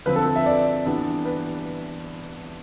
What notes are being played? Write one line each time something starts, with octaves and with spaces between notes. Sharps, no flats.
D3 F3 C4 B4
A4
A4
E5
D5
E3 G3 B3 D4
B4